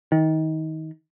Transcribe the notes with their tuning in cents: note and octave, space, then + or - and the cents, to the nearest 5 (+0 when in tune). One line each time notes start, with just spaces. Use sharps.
D#3 +25